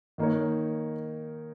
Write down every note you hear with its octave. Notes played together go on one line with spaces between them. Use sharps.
D#3 A#3 D#4 A#4 C#5